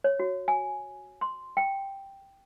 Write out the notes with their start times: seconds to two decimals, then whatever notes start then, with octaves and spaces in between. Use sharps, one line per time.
0.04 C#5
0.20 F#4
0.48 G#5
1.21 C6
1.57 G5